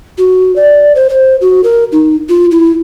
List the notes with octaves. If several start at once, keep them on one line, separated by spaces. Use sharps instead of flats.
F#4
D5
C5
C5
F#4
A#4
D#4
F4
E4